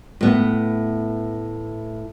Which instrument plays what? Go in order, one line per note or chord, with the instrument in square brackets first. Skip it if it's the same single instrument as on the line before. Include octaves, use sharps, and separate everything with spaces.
[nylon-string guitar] A2 B3